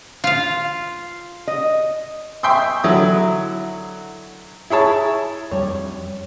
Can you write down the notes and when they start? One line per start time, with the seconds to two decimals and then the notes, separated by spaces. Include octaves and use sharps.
0.24 F4 F5
1.47 D#5
2.43 E5 G5 C6 C#6 D#6
2.84 D3 F#3 E4 D#6
4.70 E4 G#4 C#5 A5
5.51 F2 G3 C#5